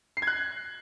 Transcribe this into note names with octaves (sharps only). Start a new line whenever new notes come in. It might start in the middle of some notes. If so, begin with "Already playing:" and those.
C7
G#6
F#6